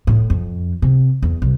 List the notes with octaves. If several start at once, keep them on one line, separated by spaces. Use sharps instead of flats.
A2
F2
C3
E2
C2